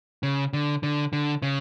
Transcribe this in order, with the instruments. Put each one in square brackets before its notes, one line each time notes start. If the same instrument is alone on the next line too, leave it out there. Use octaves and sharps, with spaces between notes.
[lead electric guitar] C#3
D3
D3
D3
C#3